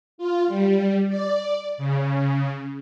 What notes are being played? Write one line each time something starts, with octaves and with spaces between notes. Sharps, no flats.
F4
G3
D5
C#3